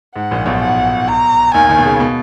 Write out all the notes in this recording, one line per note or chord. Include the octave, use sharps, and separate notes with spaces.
G#2 F#5
A#1 A#2
B1 B2
F#5
A#5
D#2 D#3 G#5
D#2 D#3
B2
C#2 C#3
B2